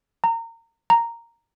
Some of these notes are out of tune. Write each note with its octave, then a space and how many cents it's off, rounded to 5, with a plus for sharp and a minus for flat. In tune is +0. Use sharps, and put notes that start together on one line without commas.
A#5 -25
A#5 -5